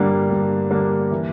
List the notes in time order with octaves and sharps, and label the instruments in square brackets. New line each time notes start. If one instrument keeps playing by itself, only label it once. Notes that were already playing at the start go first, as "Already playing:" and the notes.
Already playing: [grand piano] G2 D3 G3 A#3 D4
G2
D3 G3 A#3 D4
E3